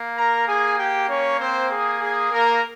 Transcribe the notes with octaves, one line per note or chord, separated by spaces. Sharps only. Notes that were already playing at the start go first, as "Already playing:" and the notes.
Already playing: A#3
A#4 A#5
G#4 G#5
G4 G5
C#4 C#5
C4 C5
G#4
G#4
A#3 A#4